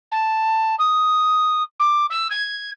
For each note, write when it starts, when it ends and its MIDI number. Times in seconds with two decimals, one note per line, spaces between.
0.12 0.75 81
0.79 1.63 87
1.80 2.06 86
2.10 2.28 88
2.31 2.71 92